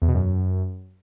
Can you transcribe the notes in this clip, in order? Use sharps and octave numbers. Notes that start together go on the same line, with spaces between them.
E2
B2
F#2